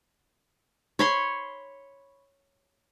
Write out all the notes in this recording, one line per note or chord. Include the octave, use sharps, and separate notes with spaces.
C#5 B5 C6